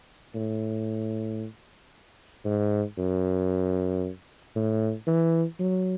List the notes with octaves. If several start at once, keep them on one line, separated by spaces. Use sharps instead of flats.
A2
G#2
F#2
A2
E3
F#3